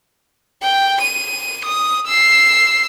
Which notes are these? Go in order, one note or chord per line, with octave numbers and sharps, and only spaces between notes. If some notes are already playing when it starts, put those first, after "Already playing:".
G5
D#7
D#6
E6 C7